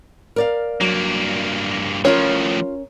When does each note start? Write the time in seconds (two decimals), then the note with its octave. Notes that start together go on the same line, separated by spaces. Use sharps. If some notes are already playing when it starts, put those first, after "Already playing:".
0.36 A#4 D5 F5
0.81 G2 F#3 A#3
2.05 A2 F3 C#4 F4 A#4 C#5